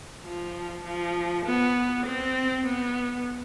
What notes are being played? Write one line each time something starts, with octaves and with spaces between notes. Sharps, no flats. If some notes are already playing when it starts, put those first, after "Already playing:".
F3
F3
B3
C4
B3